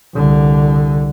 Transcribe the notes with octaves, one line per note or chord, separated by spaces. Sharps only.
C2 D3